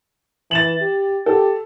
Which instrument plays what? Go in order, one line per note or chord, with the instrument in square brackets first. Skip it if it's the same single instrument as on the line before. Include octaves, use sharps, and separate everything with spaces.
[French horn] E3 [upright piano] A6 E7 F#7
[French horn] G4
[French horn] G4 [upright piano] A4